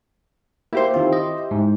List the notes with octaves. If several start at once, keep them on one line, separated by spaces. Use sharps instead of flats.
A#3 E4 G4 C5
D#3 C4 F4
D#5
G#2